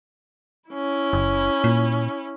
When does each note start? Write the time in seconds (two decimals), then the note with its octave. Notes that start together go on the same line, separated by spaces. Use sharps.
0.70 C#4 E4
1.13 F#1
1.64 A#2